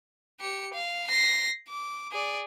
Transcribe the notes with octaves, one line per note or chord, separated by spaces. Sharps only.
G4 C#7
F5
A#6 C7
D6
G#4 D5